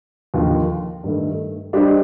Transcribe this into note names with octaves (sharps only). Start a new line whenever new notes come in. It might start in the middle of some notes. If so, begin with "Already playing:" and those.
D#2 D3 F3 A#3 F4
G2 D#3 A3
G3 D4 G4 C5 D#5